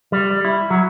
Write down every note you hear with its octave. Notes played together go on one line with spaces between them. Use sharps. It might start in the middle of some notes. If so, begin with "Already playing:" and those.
G3
E4
F#3